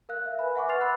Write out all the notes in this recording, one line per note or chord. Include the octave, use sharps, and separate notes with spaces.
A#4 F5 F#6
E5
B4 G#5 B5
E5 F#5 G#5 C#6 D6
B4 C6 F6 A6 C7 F7
F#5 B5 E6 F#6